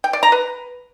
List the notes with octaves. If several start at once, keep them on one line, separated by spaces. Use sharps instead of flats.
G5
D5
A#5
B4